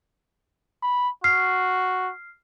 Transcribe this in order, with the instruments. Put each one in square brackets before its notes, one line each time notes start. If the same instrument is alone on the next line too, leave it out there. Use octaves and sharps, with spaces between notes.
[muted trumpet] B5
[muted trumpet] F#4 [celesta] F6 C7